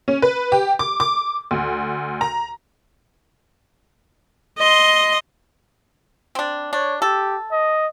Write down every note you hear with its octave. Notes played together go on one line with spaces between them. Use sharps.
C#4
B4
G4
D6
D6
D2
A#5
D#5 C6
C4 D4
D4 C#5
G4 A4
D#5